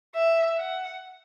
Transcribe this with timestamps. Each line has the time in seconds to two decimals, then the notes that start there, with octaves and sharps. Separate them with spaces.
0.15 E5
0.58 F#5